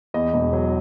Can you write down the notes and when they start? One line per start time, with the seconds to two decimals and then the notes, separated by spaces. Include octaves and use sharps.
0.14 E2 D#5
0.34 E1
0.53 F#3